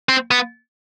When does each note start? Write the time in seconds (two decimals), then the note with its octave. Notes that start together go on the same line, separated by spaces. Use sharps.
0.09 C4
0.31 B3